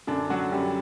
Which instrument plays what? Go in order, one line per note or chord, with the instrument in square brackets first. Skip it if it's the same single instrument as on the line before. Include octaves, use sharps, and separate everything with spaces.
[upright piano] F#2 D3 D4
F#3 F#4
F#2 G3 G4